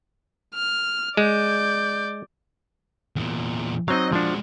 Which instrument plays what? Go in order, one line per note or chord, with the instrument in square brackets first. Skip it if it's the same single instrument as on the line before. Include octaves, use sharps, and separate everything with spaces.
[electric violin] F6
[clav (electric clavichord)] G#3 [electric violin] D5 G6
[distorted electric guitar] E2 A#2
[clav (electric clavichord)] F#3 C4 D#4 [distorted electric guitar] D#5 F5
[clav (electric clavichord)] F3 D4 [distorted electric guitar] G#3 F#4